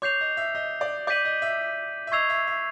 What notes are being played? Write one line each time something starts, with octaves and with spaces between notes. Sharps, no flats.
C#5 D6 G6 C7 F7
D#5
E5
D#5
D5
D5 D6 G6 B6 D#7 F#7
D#5
E5
E5
D#5 C#6 E6 G#6 C7 F7
E5
E5